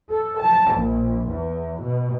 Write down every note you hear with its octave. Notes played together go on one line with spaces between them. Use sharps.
A4
A5
A#1
E2
B2